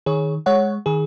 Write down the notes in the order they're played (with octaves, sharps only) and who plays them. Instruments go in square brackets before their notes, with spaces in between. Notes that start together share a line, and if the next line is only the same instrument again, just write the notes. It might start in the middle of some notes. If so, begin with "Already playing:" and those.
[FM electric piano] D#3 G#4 C#5
G#3 C#5 F#5
D#3 G#4